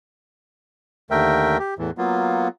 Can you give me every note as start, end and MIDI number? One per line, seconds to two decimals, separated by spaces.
1.11 1.58 39
1.11 1.58 50
1.11 1.58 57
1.11 1.58 70
1.11 1.58 76
1.11 1.58 79
1.59 1.74 67
1.79 1.91 40
1.79 1.91 45
1.79 1.91 52
1.98 2.48 54
1.98 2.48 58
1.98 2.48 59
1.98 2.48 65